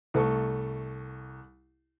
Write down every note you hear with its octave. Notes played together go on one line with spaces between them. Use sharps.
C2 A3 A4 C#6